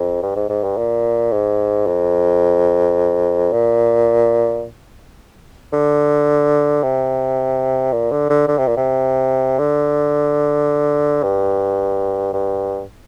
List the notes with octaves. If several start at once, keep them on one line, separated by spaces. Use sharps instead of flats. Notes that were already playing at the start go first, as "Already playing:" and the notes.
Already playing: F2
G2
G#2
G#2
G2
A#2
G#2
F2
A#2
D3
C3
A#2
D3
D3
D3
C3
A#2
C3
D3
G2
G2